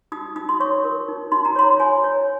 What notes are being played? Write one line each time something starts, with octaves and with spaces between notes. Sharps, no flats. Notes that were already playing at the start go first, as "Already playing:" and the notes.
D#4 D#6
D#4 D#6
C6
C#5 C#6
A#4
D#4
D#4 C6
A#5
C#5 C6
C#5 G#5
C#5